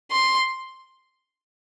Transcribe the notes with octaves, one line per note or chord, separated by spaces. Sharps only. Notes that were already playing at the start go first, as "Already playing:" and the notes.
C6